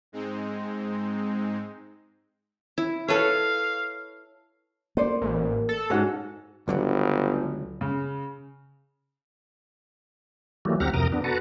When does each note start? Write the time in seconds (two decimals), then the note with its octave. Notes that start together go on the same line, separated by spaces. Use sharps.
0.12 G#2 G#3 C4 D#4
2.78 E4
3.08 A4 B4 C#5 F5
4.97 A#3 A4 C5 D5
5.22 A1
5.69 A4
5.90 G#2 C#4 F#4 F#5
6.68 G1 C#2 D3 F#3
7.81 C#3
10.65 E3 F#3 G3 A3 A#3
10.80 D2 C4 G4 F#5 A#5 F6
10.93 F2 C3 A#4 A#5 D#6 F6
11.12 B3 D4
11.24 F#4 A4 B4 A5 A#5